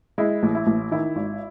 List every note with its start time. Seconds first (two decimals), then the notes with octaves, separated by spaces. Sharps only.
0.18 G#3 E4
0.43 A1
0.55 E4
0.67 A1
0.92 D#3 E4
1.16 G#1